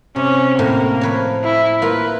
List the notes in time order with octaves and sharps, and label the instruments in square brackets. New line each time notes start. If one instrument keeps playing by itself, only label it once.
[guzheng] C3 [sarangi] C#4
[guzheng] A2 [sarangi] A#3
[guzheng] F3 B4 C#5
[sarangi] E4
[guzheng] A#3 F4 [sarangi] B4